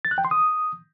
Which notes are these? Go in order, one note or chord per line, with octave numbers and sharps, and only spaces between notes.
A6
F#6
G5
C6
D#6